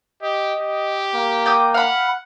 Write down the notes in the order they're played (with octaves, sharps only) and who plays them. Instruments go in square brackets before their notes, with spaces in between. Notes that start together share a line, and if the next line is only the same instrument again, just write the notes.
[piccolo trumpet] G4 [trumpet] D#5
[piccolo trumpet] G4
[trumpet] A#3
[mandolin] D5 G5 D#6
[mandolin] F5 B5 [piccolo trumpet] F#5